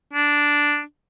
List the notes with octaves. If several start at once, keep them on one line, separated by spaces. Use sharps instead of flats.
D4